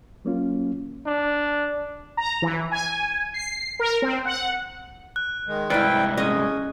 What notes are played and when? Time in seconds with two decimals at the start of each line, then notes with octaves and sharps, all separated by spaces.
0.25 F#3 A#3 C#4 F4
1.06 D4
2.17 A#5
2.42 E3
2.71 G#5
3.34 C7
3.79 A#4
4.02 C4
4.25 F#5
5.16 F#6
5.48 D#3 G#3
5.70 C2 G#2 E4 B4 D5 G5
6.17 G#3 C#4 D#5